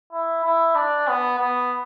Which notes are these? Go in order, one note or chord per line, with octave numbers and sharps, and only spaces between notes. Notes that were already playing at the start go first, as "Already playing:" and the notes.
E4
E4
D4
B3
B3